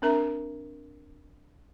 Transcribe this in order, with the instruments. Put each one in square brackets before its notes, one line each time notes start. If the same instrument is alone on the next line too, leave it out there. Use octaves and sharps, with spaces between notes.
[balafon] C4 D4 A#4 E5 A#5